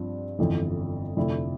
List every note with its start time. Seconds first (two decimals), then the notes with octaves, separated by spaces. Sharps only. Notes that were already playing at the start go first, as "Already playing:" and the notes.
Already playing: G2 F3 C4
0.39 G1 F2 E3
1.17 F1 F2 D3 A3 E4